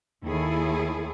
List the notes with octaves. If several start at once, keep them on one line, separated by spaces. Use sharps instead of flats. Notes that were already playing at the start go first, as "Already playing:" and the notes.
D#2 E4 G#4 A4